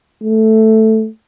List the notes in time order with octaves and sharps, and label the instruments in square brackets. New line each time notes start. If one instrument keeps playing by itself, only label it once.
[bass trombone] A3